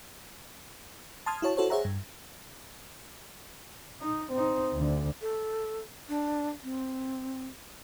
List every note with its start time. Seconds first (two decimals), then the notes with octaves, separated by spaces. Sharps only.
1.26 A5 C6 D#6 F6 G#6
1.42 E4 F#4 C#5 A5
1.57 E4 F#4 A4 C5 C#5
1.70 G#4 C5 C#5 E5 F#5 A#5
1.85 G2
4.01 D#4
4.32 C4 D#4
4.73 D2 D3
5.22 A4
6.09 D4
6.63 C4